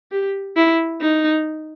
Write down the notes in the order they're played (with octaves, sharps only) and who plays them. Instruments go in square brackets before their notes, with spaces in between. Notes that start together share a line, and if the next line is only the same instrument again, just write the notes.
[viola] G4
E4
D#4